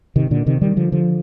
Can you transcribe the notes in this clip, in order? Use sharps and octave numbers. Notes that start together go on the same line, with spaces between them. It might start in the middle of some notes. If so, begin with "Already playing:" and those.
C3 D#3
A#2 D3
C3 D#3
D#3 G3
D3 F3
D3 F3